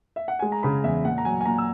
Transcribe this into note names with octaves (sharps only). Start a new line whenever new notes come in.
E5
F#5
G#3 G#5
A#5
C#3 B5
E2 E5
A#2 F#5
A#5
F#3 G#5
G#5
A#2 A#5
E6